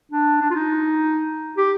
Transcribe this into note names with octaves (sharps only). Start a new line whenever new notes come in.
D4
D4
F4
D#4
G4